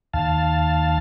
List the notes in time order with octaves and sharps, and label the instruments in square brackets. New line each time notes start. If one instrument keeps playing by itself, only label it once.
[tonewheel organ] D#2 F5 A5